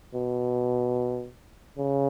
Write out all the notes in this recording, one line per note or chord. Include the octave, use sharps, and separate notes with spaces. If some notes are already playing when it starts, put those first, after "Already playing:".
B2
C#3